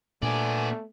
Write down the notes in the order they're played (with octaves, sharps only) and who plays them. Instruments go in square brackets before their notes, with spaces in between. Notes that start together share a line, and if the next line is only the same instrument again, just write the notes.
[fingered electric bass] A#2 D4 [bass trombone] A3 [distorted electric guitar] B3 D5 [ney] G#5